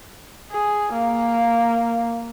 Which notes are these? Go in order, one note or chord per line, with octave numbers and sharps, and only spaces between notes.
G#4
A#3